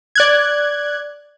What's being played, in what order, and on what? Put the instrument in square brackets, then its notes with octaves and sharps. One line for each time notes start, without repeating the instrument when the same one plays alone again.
[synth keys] D5 F#6 G#6